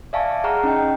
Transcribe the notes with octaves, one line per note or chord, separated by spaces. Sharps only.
D5 E5 F5 G#5 A5 C#6
G#4 F#5 A#5 C#6 F6
C#4 D#4 D#5 G5